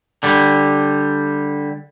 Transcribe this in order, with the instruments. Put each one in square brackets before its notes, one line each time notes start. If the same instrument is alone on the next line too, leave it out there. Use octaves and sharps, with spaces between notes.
[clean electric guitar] D3 G3